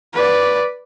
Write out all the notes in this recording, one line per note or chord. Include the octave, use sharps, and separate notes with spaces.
B4 D5